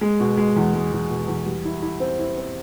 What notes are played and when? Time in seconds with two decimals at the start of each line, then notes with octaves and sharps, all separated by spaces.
0.01 G#3
0.20 B2
0.37 G#3
0.56 E2
0.74 G#3
0.93 E2
1.10 B2
1.28 E2
1.46 G3
1.65 E4
1.82 E4
2.00 C4
2.19 E4
2.37 C4